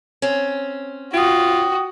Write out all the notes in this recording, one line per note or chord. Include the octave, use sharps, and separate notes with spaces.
C4 C#4
F4 F#4 G5 D#6